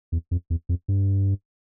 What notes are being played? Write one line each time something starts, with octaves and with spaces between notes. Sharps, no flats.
E2
F2
E2
F2
G2